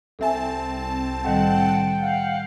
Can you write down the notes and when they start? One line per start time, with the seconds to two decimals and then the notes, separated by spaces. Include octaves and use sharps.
0.19 C2 C4 A4 E5 G#5 A5
1.25 A2 D#3 G3 F#5 G5
2.00 F5 F#5